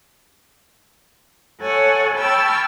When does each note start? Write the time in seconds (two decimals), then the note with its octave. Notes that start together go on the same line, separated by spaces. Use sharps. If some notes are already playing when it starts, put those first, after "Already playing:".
1.62 A4 C#5 F#5 G#5
2.16 G5 A5 B5 C#6 E6 F6